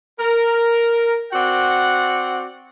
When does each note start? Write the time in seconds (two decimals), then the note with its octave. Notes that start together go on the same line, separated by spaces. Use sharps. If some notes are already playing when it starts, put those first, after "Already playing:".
0.19 A#4
1.33 C4 F#4 D5 F#5